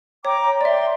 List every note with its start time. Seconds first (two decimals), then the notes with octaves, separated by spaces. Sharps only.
0.25 C#5 G5 A#5 D6
0.61 D5 E5 G5 C6